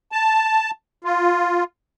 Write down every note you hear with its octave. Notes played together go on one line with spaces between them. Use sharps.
A5
F4